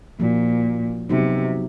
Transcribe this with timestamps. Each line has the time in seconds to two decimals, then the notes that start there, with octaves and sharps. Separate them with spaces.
0.19 A#2 F3 A#3 D#4 F#4
1.09 C3 F#3 B3 D#4 F#4